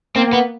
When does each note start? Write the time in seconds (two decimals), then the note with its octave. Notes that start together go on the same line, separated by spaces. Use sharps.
0.16 A#3 C4
0.33 B3